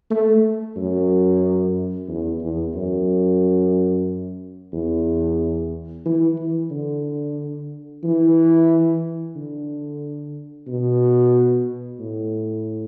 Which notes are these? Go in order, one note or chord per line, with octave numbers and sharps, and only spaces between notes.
A3
F#2
E2
E2
F#2
E2
E3
E3
D3
E3
D3
B2
A2